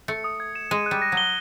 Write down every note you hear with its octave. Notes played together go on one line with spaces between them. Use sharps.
A3 C#7
D#6
G#6
E7
G#3 D#7
F#6
G3
A#6
F#3
G7